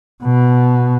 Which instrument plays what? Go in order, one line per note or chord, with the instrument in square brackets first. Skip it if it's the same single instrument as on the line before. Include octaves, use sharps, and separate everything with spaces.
[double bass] B2